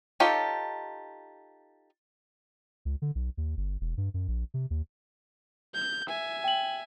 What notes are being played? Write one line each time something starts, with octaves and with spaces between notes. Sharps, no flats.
D#4 F4 G4 A4 C#5
C#2
D3
B1
D#2
G1
E1
G2
F#2
A#1
C3
D#2
G6
E5 G#5
G5 F#7